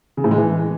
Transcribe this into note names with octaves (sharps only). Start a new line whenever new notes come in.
C#3
A2
G#3
E3